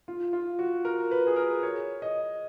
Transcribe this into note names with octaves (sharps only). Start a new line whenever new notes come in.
F4
F4
F#4
A#4
B4
G#4
A#4
C#5
D#5